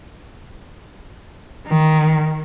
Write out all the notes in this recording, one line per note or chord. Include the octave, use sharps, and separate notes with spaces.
D#3